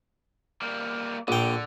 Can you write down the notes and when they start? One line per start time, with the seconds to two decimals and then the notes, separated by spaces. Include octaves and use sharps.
0.62 G3 A#3
1.28 A#1 D3 G5